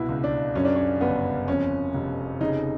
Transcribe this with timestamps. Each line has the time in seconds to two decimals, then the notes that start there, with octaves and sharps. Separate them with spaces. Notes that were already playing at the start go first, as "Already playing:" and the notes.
Already playing: C2 B2 E4
0.09 C#2
0.24 D4
0.55 F#2 C#4
0.65 D4
0.76 C#4
1.01 G1 B3
1.47 F2 C#4
1.94 F1
2.40 C#3 D#4